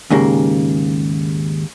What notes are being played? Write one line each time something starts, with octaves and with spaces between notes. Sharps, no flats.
D#2 G#2 C#3 A#3